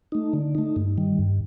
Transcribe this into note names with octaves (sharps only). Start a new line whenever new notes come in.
A3 D#4
D3
A3 D#4
G2
D#3 G3
G2